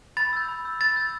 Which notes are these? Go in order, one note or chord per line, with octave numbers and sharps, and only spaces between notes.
B5 A6
E6 G6
B5
E6 G6
B5 A6
E6 G6